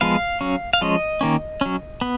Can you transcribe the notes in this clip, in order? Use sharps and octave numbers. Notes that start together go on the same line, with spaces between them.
F3 G#3 B3 F5
F#3 C#4
F5
F3 G#3 C#4 D#5
D#3 A#3 C#4
F#3 C#4
B3